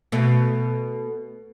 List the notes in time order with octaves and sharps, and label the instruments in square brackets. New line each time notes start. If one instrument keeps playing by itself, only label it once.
[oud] B2 A3